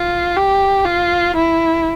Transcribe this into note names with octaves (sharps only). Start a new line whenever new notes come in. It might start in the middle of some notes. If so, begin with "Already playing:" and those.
Already playing: F4
G4
F4
E4